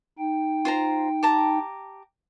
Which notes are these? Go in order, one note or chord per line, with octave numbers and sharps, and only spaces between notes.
D#4 G5
F4 C5 A#5
G4 A5 A#5